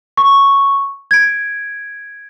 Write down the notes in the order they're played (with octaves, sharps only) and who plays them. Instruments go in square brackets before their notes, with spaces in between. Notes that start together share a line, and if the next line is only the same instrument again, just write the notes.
[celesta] C#6
G#6 D7